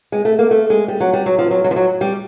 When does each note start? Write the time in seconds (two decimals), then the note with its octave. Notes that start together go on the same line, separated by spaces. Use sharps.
0.12 G#3
0.25 A3
0.39 A#3
0.51 A3
0.70 G#3
0.88 G3
1.00 F#3
1.13 G3
1.26 F#3
1.39 F3
1.51 F#3
1.64 F#3
1.71 F3
1.76 F#3
2.01 G3